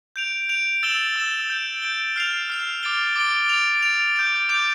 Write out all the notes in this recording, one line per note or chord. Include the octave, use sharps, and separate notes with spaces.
G6 D7 F7
G6 D7 F7
E6 A6 E7 G7
E6 A6 E7 G7
G6 D7 G7
G6 D7 G7
F6 C7 F7
F6 C7 F7
D6 A6 D7 G7
D6 A6 D7 G7
A6 D7 F7
A6 D7 F7
D6 G6 D7 F7
D6 G6 D7 F7